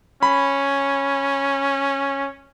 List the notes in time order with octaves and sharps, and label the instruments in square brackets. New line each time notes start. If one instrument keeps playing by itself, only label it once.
[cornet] C#4 [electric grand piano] B5